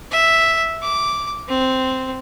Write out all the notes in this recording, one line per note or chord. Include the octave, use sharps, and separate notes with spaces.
E5
D6
C4